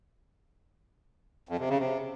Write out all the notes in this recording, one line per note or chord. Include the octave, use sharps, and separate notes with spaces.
F2
C3
C#3
C3